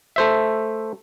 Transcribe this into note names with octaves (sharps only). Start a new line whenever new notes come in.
A3 C5 E5